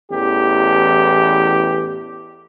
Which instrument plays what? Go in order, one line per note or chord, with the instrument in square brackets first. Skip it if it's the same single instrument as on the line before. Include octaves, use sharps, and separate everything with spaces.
[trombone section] A1 E2 G4